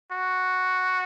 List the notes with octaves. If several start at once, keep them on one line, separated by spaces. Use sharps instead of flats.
F#4